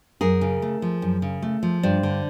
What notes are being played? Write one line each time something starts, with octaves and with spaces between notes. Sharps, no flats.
F#2 G#4 A#4
C#3
A3
F3
F#2
C#3
A3
F3
G2 C5 D5
D3